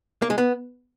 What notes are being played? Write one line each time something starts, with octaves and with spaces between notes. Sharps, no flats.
A#3
G#3
B3